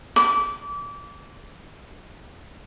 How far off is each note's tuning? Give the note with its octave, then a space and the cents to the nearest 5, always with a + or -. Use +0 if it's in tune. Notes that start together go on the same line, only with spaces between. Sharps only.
D6 -30